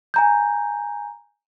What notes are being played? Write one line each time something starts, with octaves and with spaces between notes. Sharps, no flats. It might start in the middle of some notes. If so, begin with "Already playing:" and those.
G#5 A#5 G6